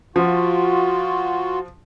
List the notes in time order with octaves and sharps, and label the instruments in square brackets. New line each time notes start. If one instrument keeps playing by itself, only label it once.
[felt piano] F3 [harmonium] F4 F#4